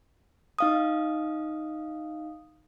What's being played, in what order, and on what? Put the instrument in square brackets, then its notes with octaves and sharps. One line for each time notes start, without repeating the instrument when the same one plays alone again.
[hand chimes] D#4 F5 D#6